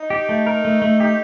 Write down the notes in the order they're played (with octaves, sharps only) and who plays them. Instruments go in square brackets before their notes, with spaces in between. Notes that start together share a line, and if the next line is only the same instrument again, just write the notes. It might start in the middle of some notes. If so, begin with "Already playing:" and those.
Already playing: [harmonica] D#4
[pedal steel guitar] G4
A3
A#4
A3
A3
[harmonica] D#4 [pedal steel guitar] G4